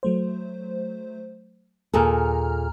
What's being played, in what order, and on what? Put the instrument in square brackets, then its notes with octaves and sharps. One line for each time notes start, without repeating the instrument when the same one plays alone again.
[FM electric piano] F#3 A3 C5
[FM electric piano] D#2 A#5 F6 [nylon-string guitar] A#2 G#4 A4